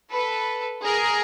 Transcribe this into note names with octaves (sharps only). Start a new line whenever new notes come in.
A4 B4
G#4 A#4